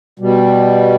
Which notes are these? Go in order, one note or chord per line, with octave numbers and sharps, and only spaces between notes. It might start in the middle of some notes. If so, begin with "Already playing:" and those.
B2 G3